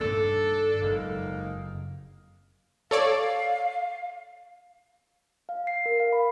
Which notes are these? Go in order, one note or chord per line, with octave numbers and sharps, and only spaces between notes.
G2 D#3 A#3 D4 A4
F#1 F2 G#2 A#3 D#4
A4 C#5 D5 F5
F5
C7
A#4
F5
B5